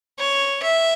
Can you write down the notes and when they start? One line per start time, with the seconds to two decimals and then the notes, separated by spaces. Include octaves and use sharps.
0.19 C#5
0.62 E5